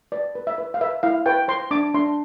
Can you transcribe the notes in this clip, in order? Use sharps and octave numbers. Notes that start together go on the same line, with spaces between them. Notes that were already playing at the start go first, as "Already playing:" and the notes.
B4 D5
B4
E5
B4
F5
B4 E5
E4 F5
B4 G5
C5 C6
D4 D6
D4 C6